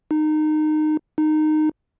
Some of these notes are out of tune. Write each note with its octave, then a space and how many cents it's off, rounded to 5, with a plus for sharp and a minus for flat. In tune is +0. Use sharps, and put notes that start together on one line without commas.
D#4 -20
D#4 -15